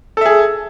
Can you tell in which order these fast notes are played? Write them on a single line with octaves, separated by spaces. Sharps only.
A4 E5 G#4